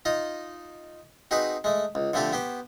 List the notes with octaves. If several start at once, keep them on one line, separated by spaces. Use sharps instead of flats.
D#4 F4 D#5
C4 D#4 F#4 G#4 B4
G#3 A3
C#2
D3 F3 A3 C4 G4 A4
B3 G4 C5